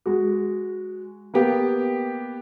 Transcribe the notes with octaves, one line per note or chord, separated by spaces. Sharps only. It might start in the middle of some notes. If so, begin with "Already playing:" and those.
G#3 F#4
A#3 B3 G4